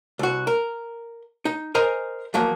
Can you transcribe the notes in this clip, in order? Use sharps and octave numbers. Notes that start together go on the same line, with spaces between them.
C2 F#4
A#4
D#4
A#4 C5 D#5 G#5 A#5
E2 F3 F#3 A#3